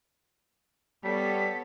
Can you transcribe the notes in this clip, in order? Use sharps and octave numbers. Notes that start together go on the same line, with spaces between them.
G3 B3 A4 C#5 B6